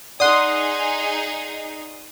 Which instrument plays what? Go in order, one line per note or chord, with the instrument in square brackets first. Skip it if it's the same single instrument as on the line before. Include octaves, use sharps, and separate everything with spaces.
[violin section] D#4 G#4 [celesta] D5 F#5 F#6 [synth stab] C6 D#6